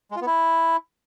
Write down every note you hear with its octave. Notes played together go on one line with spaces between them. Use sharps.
G#3
F4
B3
E4